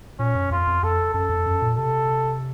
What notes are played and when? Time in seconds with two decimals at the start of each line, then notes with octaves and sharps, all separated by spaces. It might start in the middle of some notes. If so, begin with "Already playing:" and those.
0.19 A#2 C#4
0.35 F#2
0.51 F2 F4
0.67 F2
0.83 F2 A4
1.14 F#2 A4
1.29 F2
1.46 F#2
1.62 A#2
1.77 C3 A4